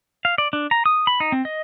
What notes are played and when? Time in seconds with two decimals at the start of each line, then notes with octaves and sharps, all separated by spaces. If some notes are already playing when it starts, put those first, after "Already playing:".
0.25 F5
0.38 D5
0.53 D4
0.71 A#5
0.86 D#6
1.07 B5
1.20 D#4
1.32 C4
1.45 D#5